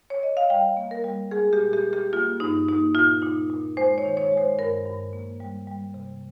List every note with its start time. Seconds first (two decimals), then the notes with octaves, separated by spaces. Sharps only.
0.10 C#5
0.23 D#5
0.37 F5
0.50 G3 G5
0.77 A#3
0.91 A#4
1.04 G3
1.31 G#3 G#4
1.53 G4
1.60 A#2
1.73 G4
1.86 A#2
1.93 G4
2.13 A#3 F4
2.40 G2 D#4
2.68 A#3 D#4
2.95 A#2 F4
3.22 A#2 D#4
3.50 A#2
3.77 G#3 C5
3.98 C#5
4.05 D#3
4.17 C#5
4.32 G#3
4.38 C5
4.59 G2 A#4
4.86 G2
5.13 A#3
5.40 G3
5.67 G3
5.94 C3